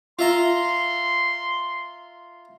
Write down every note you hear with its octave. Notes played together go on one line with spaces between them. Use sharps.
F4 E5 A#5 C6